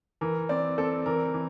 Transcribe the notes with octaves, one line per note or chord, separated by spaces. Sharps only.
E3 A#4
C4 D5
C4 A4
E3 A#4
E3